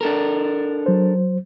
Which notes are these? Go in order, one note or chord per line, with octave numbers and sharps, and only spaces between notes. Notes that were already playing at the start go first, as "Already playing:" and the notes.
D4 A4 A#4
F#3 C5